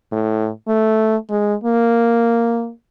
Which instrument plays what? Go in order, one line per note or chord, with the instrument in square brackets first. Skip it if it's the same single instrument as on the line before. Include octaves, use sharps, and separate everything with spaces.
[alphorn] A2
A3
G#3
A#3